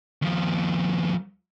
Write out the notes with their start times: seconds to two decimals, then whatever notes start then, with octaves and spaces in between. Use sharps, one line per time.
0.22 D#2 F3